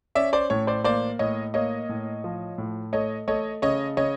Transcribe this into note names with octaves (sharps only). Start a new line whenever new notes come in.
C#4 D5 E5
C5 D5
A2 C#5
C5 D5
A#3 C5 D5
A2 C#5 D#5
A#3 C#5 D#5
A2
F3
A2
A3 C#5 D#5
A3 C#5 D#5
C#3 C#5 D#5
C#3 C#5 D#5